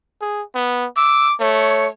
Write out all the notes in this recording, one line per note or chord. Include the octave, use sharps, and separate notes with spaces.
G#4
B3
D6 E6
A3 C#5